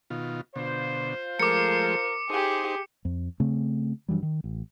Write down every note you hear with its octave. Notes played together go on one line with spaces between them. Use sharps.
B2 D#3 F4
B2 D3 F4 C5
F3 G#3 A3 A#4 D6 C#7
D#4 G4 G#4 C5
F2
C#3 A3 C4
G2 E3 F#3 G3
D#3
A1